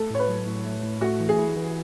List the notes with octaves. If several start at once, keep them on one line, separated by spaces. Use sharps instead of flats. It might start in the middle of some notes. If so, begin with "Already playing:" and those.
Already playing: A3 A4
A2 C#5
B4
F#3
A2
A3
A2
A3 F#4
E3
G#4
E4
E3